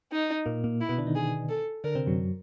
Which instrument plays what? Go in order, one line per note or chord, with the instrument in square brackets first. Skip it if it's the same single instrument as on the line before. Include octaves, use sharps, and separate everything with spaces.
[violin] D#4
[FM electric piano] A#2 A#3
A#2 A#3
[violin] E4
[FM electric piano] B2 B3
D3 D4
D#3 D#4
[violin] G#4
A4
[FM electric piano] D3 D4 [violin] A#4
[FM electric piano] C3 C4
F#2 F#3